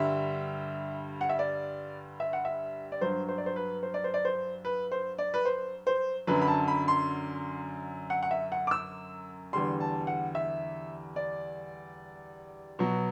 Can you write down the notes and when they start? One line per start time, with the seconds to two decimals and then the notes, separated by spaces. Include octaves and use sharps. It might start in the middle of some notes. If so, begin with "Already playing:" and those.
Already playing: G2 D3 G3 E5
1.21 F#5
1.29 E5
1.39 D5
2.20 E5
2.33 F#5
2.45 E5
2.92 D5
3.01 G2 F#3 C5
3.29 C5
3.38 D5
3.46 C5
3.56 B4
3.83 C5
3.94 D5
4.04 C5
4.14 D5
4.25 C5
4.65 B4
4.91 C5
5.18 D5
5.34 B4
5.45 C5
5.87 C5
6.27 F#2 D3 F#3 B4
6.42 B5
6.47 A5
6.68 B5
6.88 C6
8.10 F#5
8.23 F#5
8.31 E5
8.52 F#5
8.67 D6
8.71 E6
9.53 E2 D3 G3 C6
9.80 A5
10.07 F#5
10.35 E5
11.16 D5
12.79 B2 F#3